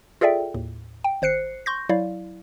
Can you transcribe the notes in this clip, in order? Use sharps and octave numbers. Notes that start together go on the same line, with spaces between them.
F4 G#4 A4 D5 E5 G5
D#2 A2
G5
G#1 C5 F#6 C7 C#7
C6 C#6 G6 A#6
F#3 E4 D5 F5